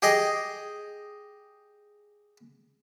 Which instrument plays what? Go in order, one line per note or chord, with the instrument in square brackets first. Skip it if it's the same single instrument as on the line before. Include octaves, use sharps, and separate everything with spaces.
[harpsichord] G4 G#4 D#5